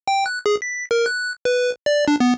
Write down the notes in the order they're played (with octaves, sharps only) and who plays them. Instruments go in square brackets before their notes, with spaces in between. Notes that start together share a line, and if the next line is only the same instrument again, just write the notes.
[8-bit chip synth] G5
F#6
G#4
B6
A#4
F#6
B4
D5
D4
B3